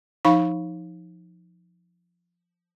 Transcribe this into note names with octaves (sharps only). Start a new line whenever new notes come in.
F3 D#4 F5 B5 C#6